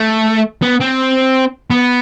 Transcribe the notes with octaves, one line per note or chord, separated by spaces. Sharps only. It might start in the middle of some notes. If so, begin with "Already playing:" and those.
Already playing: A3
B3
C4
B3